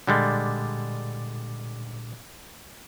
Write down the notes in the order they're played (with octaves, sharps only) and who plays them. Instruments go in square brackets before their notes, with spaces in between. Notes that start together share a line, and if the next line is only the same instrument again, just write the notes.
[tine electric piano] A#2 D6 A6 [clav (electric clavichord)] D3 G3 G#3